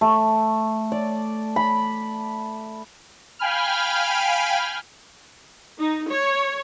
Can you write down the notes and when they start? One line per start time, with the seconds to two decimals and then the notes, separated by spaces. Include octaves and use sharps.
0.01 A3
0.92 D5
1.56 B5
3.39 F5 G5 G#5 B5 F6
5.79 D#4
6.10 C#5